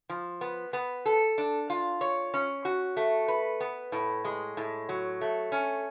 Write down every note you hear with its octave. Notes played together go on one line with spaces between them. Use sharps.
F3
B3
B3
A4
D4
F4
C#5
C#4
F#4
A3
B4
B3
A2
G#3
A2
F#3
A3
C#4